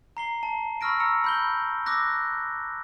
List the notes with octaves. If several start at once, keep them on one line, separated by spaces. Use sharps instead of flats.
A#5 C7 G7
A5
B5 C#6 E6 F6 A#6 D7
A#5 E6 C#7
B5 G6 G7
D6 E6 F#6 A#6